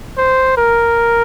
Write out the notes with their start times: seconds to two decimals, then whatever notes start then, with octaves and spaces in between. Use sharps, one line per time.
0.17 C5
0.57 A#4